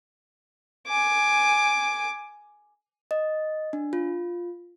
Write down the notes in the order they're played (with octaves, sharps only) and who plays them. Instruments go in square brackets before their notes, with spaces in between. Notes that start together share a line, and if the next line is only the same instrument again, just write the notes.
[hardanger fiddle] G#5 D6
[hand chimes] D#5
D4
F4